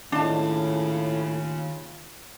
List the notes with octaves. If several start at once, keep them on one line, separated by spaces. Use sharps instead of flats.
D#2 A2 C#3 D4 F4 A5